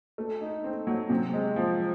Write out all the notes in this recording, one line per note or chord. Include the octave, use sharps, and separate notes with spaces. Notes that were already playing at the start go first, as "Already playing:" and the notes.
A3
D#4
C4
F#3
C3
G#3
F3